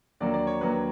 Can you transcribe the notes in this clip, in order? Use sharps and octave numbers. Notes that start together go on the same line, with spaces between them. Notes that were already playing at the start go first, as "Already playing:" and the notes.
D#2 D3 F#3 A#3 D5
D5
C#5
D#2 D3 F#3 A#3 B4